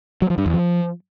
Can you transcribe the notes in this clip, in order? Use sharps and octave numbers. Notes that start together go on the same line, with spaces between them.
F#3
F3
G2
E2
F3